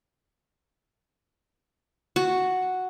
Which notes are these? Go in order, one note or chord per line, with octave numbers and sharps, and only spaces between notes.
F#4